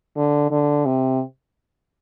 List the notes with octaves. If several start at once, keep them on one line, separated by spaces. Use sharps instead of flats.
D3
D3
C3